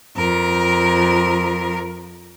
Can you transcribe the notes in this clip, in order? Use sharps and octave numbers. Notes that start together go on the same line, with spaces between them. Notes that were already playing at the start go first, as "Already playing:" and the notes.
F2 A#4